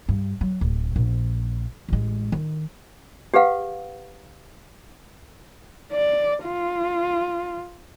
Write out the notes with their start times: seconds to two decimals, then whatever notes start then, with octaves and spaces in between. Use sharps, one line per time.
0.09 G2
0.41 F#3
0.61 D1
0.96 A#1
1.89 A1 G#3
2.32 D#3
3.34 G4 G#4 B4 F5 F#5
5.93 D5
6.44 F4